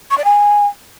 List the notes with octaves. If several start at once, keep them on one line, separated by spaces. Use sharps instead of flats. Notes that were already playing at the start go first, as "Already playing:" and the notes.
C#6
D5
G#5